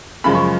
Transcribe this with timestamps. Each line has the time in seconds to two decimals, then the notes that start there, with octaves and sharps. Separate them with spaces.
0.24 F#2 C#3 F3 G#3 B5
0.35 C#6